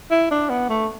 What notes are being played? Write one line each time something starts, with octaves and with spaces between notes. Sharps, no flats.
E4
D4
B3
A3